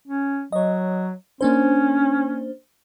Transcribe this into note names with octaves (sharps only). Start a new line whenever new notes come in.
C#4
F#3 C#5 D#5
A#3 C#4 D4 C5